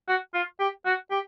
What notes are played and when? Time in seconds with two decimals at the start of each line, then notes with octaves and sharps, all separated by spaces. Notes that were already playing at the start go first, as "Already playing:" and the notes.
0.08 F#4
0.34 F4
0.60 G4
0.86 F#4
1.11 G4